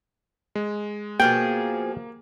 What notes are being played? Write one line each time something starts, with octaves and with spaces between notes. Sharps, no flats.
G#3
B2 F3 A#3 G#4 G5